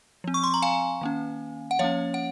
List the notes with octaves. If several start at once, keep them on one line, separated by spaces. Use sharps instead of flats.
F3 C4
C#6
C6
A#5
F5 G#5
D#3 A#3 C#4
F#5
F3 A#3 C#4 C#5 F5
F#5